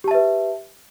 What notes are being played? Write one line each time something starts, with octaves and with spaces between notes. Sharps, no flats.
G4 B4 E5 A5